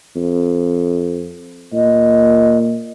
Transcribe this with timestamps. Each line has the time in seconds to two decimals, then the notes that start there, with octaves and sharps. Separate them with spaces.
0.16 F2
1.73 A#2 D#5